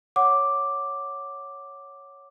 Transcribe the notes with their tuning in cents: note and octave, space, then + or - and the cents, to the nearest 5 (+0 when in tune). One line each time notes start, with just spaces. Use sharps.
C#5 +0 F#5 +0 D6 +0